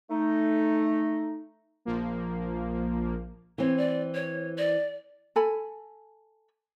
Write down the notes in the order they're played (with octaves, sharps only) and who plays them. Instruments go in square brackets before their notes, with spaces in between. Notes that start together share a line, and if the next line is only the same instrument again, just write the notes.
[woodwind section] A3 D#4
[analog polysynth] A#1 F3 A#3
[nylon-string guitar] E3 C4 [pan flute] C#5
[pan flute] D5
C#5
D5
[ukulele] A4 G#5 B5